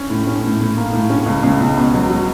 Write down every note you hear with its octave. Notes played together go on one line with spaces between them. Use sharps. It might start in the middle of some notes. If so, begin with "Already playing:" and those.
Already playing: C#4
A2
C#4
A2
A2
A#3
A2
C#4
C#2
C#2
C#2
B2
F#3
F#3